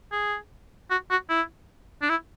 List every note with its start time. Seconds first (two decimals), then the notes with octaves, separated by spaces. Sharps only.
0.12 G#4
0.91 F#4
1.11 F#4
1.29 E4
2.02 D4
2.10 E4